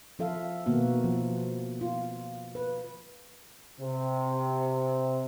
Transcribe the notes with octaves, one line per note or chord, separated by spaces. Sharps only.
F3 F4 A4 E5 F5
B2 D#3 A#3 B3 F#4
F3
F4
B4
C3